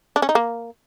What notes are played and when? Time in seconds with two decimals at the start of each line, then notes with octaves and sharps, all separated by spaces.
0.16 D4
0.22 C#4
0.29 D#4
0.35 A#3